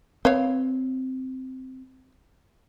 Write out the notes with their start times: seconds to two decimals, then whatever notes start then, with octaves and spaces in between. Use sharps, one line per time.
0.25 C4 B4 C#5 F5